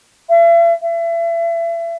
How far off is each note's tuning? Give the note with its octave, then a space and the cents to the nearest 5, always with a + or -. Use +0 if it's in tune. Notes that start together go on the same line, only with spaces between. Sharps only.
E5 +45
E5 +35